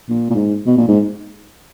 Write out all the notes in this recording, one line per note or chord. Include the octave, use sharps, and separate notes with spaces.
A#2
A#2
G#2
B2
A#2
G#2